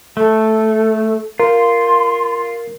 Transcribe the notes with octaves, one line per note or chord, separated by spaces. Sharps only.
A3 A4
F4 A#4 C6